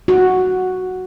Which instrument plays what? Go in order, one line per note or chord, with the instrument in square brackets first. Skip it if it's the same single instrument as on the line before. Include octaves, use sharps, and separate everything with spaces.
[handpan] F#4